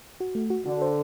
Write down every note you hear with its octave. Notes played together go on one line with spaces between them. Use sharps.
F#4
A3
F#4
D3 F#4
C5